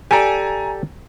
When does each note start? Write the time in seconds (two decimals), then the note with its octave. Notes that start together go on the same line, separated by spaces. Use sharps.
0.11 G4 A4 D5 G#5 A#5